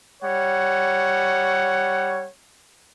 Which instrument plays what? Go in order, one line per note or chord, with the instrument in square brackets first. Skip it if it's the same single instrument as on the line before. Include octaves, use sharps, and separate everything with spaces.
[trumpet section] G3 C#5 F#5